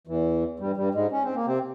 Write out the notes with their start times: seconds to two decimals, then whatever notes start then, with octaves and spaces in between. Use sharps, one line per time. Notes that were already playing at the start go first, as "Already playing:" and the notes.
0.07 E2 E3
0.60 G2 G3
0.77 G2 G3
0.95 G#2 G#3
1.12 C#4
1.24 C4
1.35 A#3
1.46 C3 C4